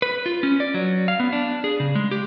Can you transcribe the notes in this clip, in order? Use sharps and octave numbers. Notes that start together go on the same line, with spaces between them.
B4
F4
C#4
D5
F#3
F5
B3
D4
G#4
C#3
G#3
G4